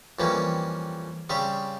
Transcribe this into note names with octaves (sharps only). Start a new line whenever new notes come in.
F2 E3 G3 A#3 C#4
C#3 G3 C4 G4